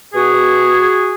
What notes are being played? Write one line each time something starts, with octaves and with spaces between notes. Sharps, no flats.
B2 F#4 G#4
B2